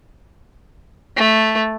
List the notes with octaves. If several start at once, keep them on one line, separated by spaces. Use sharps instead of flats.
A3